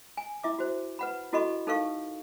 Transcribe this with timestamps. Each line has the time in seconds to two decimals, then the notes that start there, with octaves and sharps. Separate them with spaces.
0.17 G#5
0.44 E4 E5 D6
0.59 F#4 C5
0.99 B4 F#5 B5
1.33 E4 F#4 A4 D#5 B5 C#6
1.67 D#4 A4 A#4 F5 C#6